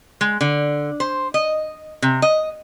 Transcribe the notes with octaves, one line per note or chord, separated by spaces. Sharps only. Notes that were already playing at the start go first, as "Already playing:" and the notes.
G#3
D3
C5
D#5
C3
D#5